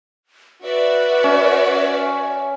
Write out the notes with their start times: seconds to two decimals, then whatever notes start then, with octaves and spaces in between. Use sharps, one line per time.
0.64 F#4 B4 D5 E5
1.24 C#4